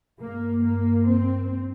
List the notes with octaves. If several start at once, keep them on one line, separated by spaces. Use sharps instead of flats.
G2 A#3
A#3
C4